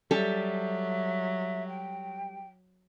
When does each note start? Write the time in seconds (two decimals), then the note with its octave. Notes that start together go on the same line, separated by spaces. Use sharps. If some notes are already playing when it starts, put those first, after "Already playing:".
0.11 F#3 G3 G4 A4 E5
1.68 G5